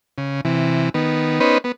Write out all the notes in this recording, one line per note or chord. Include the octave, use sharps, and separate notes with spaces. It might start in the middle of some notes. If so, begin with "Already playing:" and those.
C#3
C3 E3
D#3 B3
B3 C#4 D#4 B4 C5
B3